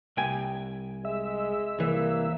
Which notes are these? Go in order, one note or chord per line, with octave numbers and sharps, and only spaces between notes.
C2 G5 G#5
G#3 E5
C2 E3 A#3